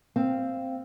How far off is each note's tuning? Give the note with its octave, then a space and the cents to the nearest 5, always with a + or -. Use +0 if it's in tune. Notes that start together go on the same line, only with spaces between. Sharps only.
C4 +0 F5 -10